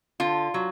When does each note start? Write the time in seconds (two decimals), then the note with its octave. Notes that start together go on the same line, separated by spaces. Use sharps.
0.20 D3 F4
0.54 F#3